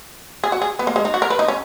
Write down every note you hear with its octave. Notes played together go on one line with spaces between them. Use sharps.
G#4
F#4
G#4
B3
A#3
G#3
D#4
F#4
A#4
B4
D#4
C#4